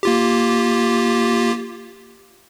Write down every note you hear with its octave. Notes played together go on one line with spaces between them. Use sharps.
A#3 F4 G4